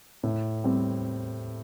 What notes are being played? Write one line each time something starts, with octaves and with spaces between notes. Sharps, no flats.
A2
G3 C4